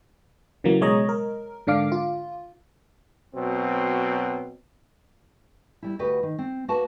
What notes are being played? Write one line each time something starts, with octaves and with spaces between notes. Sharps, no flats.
C#3 E3 F#3 A#3
B2 G#3 C#5 D#5 A#5
A#4
G#2 D3 D4 F5 D6
F4
B2 F#3 C4
G3 E4
D2 F#4 G4 B4 D#5
D#3
C4
A#3 F#4 B4 A5